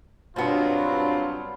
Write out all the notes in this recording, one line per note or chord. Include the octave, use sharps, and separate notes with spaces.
G2 B2 F#3 B3 C4 D4 F4